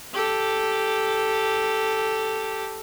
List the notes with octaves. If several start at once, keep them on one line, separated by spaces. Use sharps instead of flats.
G4 A4